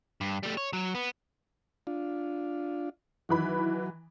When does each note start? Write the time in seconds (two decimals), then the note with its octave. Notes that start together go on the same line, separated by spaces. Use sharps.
0.21 G2
0.43 G3 A3
0.57 C#5
0.73 F#3
0.95 B3
1.87 D4 F4
3.29 D#3 E3 F#3 B5